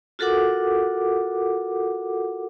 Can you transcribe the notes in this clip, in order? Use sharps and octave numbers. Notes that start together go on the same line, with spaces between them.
F4 F#4 A4 A#4 F#5 D6